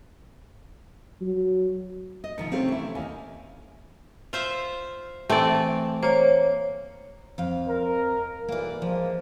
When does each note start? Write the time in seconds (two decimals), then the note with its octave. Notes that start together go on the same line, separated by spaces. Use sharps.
1.21 F#3
2.24 D#5
2.38 B2 D#3 F3 C#7
2.52 C3 A3 C4 C#4 F5
2.68 E3 E4
2.95 D#2 D#5 F5 G#5
4.33 F4 C5 E5
5.29 E3 A3 C4 D5
6.03 A#3 C5 C#5
7.38 F2 F5
7.69 A#4
8.48 B1 E3 A#3 D5
8.82 F3 G#3 A#3